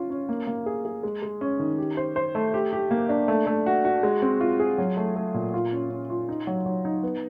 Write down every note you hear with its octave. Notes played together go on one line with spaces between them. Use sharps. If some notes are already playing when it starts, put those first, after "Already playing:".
Already playing: C#4 F4
C#4
A#3
A#3
G#4
G#4
G#3
G#3
C#4
D#3
G4
C5
C5
A3
G4
G4
A#3
D4
A3
A3
F#4
F#4
G#3
C4
F4
G#4
F#3
A3
A3
A#2
F4
C#4
C#4
F4
D#4
F#3
F#3
D#4
B3